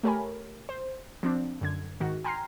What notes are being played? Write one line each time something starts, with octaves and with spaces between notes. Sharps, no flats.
A3 G4 A#4 C#5 G#5 B5
C5
F3 C4 D4
F#2 D3 G#6
G#2 D#3 F#4
G5 G#5 A#5 C6 F6 C7